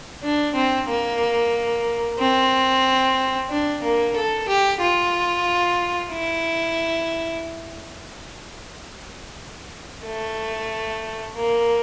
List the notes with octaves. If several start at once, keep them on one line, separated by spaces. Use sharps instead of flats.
D4
C4
A#3
C4
D4
A#3
A4
G4
F4
E4
A3
A#3